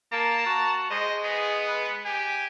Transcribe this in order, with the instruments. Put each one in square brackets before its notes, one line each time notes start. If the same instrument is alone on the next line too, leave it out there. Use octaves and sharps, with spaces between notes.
[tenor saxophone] A#3 [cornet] A5 [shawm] A#5
[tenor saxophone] F#4
[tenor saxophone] G#3 [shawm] C5 [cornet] D#5
[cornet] B3 [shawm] G#4
[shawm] B4
[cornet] G4 [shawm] G#5